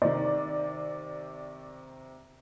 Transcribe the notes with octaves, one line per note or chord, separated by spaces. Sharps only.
C3 D#3 D5